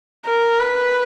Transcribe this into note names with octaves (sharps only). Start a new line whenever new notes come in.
A#4
B4